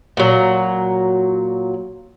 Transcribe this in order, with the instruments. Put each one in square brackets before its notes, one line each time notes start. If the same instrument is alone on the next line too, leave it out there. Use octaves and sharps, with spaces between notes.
[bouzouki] A#2 F#3